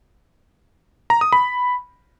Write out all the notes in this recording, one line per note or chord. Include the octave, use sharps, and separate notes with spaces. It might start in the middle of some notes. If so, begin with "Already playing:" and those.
A#5
D#6
B5